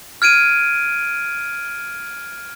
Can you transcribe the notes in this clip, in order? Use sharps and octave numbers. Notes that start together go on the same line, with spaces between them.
F6 G#6 D7 D#7